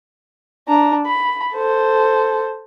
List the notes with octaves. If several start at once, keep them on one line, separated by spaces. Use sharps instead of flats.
D4 A#5
B5
A4 C5